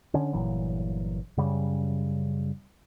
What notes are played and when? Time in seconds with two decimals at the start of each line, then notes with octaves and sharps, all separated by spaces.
0.14 D3 C#4
0.33 G1 A#2 E3 F#3
1.37 F#2 C#3 G3